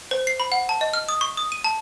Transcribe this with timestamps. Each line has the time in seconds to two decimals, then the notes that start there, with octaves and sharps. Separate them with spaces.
0.11 C5
0.27 C7
0.40 B5
0.52 F#5
0.69 A5
0.81 D#5
0.94 F6
1.09 D#6
1.21 C#6
1.37 D#6
1.52 D#7
1.64 A5